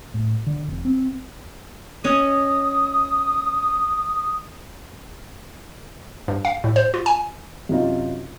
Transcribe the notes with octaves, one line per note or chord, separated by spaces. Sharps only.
A2
D3
F1
C4
C#4 D#5 D#6
G2
F5
A2
C5
F4
G#5
F#2 C3 D#4 F4